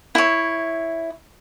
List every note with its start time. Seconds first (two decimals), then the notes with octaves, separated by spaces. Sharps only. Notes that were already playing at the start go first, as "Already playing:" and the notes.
0.15 E4 C#5